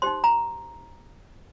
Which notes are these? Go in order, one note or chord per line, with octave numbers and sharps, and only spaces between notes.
D#4 G4 C5 C6
A#5